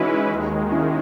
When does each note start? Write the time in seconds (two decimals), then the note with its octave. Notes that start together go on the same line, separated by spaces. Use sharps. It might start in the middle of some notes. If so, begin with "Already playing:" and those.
Already playing: E3 G#3 C#4 D#4 E4 F#4 G#4 B4
0.30 D#2 D#3 G#3
0.71 C#4 E4